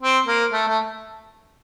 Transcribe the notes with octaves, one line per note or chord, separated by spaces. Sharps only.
C4
A#3
A3
A3